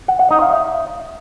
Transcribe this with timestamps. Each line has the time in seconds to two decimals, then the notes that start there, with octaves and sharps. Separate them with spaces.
0.08 F#5
0.19 F#5
0.31 D#4
0.42 F5
0.53 E5